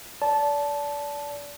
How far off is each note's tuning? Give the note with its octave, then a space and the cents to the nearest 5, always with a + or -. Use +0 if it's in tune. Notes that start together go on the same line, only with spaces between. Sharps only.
D5 -30 A5 -10